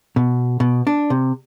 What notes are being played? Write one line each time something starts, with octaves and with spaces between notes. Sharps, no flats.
B2
B2
D4
C3